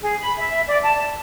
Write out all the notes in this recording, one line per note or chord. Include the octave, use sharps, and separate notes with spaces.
G#4
B5
E5
D5
A5